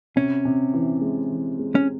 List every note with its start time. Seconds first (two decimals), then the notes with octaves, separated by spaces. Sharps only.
0.16 C3 C#4
0.45 C3
0.74 E3
1.02 G#3
1.29 E3
1.59 G#3
1.75 C#4